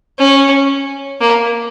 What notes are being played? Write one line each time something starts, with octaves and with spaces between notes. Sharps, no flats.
C#4
A#3